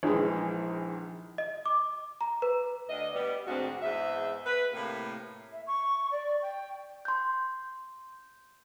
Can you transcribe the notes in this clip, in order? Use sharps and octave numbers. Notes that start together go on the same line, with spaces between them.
A#1 D#3 E3 G#3
D#5
D6
A#5
B4
D2 D4 D#5
G3 B3
D2 G#2 C4 D4 F#4
E2 G#2 E5
B4
A2 C3 A#3
E5
C#6
D5
G5
C6 G6